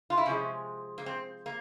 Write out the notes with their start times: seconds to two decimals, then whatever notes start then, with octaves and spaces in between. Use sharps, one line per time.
0.10 F4
0.18 E4
0.26 C3 F3 G#3 C#4
0.98 A#3
1.06 C4
1.46 A#3